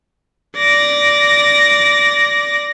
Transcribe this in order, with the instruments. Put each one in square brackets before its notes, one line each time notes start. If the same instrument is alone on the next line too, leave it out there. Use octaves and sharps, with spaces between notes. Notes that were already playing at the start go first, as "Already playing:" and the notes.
[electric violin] D5 A#6